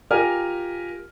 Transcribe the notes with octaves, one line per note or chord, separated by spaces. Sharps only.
F4 G4 A#4 G#5 F6